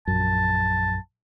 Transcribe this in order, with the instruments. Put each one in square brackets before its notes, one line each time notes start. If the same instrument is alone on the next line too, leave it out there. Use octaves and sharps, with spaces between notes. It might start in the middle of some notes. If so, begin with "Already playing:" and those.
[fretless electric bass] A#1 F#2 [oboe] A5